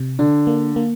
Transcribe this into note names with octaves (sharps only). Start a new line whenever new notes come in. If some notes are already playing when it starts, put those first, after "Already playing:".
Already playing: C3
D3 D4
A#3
A#3